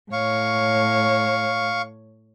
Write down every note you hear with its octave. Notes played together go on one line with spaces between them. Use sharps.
A2 C#5 F5 C#6